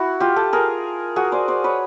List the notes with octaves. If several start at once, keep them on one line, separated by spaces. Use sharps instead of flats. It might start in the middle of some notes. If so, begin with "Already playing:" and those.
Already playing: E4 F#4
F4 G4
G4 A4
G#4 A#4
F#4 G#4
C5 D5
C5 D5
B4 C#5